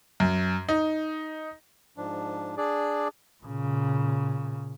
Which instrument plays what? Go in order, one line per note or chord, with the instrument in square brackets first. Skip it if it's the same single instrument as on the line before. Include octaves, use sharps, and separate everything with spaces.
[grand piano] F#2
D#4
[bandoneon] G#2 F3 D4
D4 G#4 D5
[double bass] A#2 C#3